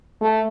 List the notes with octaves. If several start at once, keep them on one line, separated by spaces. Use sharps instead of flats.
A3